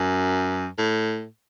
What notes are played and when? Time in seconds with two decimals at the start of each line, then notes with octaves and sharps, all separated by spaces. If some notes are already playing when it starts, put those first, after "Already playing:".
Already playing: F#2
0.78 A2